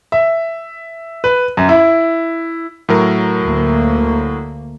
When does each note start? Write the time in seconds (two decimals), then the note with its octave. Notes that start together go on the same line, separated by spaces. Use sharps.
0.12 E5
1.24 B4
1.57 F#2
1.69 E4
2.89 A2 F#3 A#4
3.42 D2 A#3